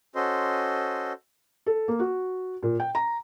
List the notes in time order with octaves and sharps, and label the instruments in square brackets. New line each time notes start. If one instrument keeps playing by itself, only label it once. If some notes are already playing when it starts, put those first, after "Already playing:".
[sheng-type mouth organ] C#4 F#4 A4 C5 D#5 C6
[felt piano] A4
A#3
F#4
A#2
G5
A#5